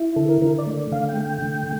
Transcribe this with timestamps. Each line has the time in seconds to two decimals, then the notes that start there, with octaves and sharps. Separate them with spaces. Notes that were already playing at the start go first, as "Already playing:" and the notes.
Already playing: E4
0.16 D3 A4
0.29 A#4
0.42 D3 A#4
0.58 D5
0.67 A3
0.92 D3 F5
1.09 G5
1.17 A3
1.25 G5
1.42 D3